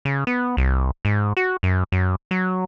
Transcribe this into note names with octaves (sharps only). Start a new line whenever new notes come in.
C#3
B3
C2
G#2
F#4
F#2
F#2
F#3